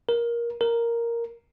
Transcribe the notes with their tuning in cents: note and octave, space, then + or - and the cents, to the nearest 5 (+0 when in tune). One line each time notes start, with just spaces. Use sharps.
A#4 +15
A#4 +0